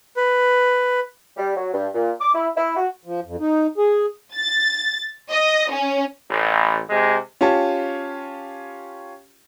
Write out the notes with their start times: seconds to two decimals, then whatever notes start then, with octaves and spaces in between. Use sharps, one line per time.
0.17 B4
1.36 G3
1.55 F#3
1.72 G2
1.94 A#2
2.20 D6
2.34 E4
2.56 E4
2.77 F#4
3.05 F3
3.25 F2
3.40 D#4
3.78 G#4
4.34 A6
5.30 D#5
5.71 C#4
6.29 A1
6.89 C3 G#3
7.41 C#4 F4 G4 C#5 A5